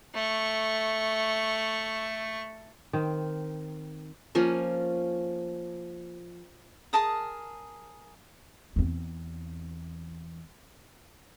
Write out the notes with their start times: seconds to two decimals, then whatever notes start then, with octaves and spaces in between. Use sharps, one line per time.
0.14 A3 C#6
2.93 D#3 C4
4.35 F3 A#3 C#4
6.93 G#4 A#4 A5 D#6
8.76 E2 C4